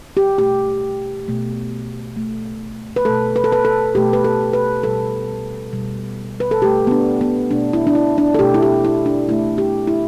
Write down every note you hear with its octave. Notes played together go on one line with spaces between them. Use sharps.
G4
B2 A3 G4
B2 A3
B2 A3
B4
B2 A3 A4
B4
A4
B4
A4
B2 A3 G4
B4
A4
B4
B2 G3 A4
B2 G3
B4
A4
B2 A3 G4
B3
D4
B3
B2 A3 D4
E4
D4
E4
D4
A4
B2 A3 G4
E4
G4
E4
D4
B2 A3 E4
G4
E4